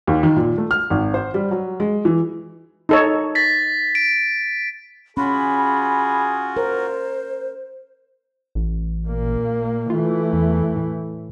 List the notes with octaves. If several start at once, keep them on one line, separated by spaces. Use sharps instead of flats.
D#2
D#3
A#2
A3
F6
G#1
C5
G3
F#3
G#3
E3
D#4 A4 C#5
A6 B6
D7
C#4 F4 F#4 G#4 B5
A#4 C5
A1
A#2 A#3
E3 A3 F4
E2
A2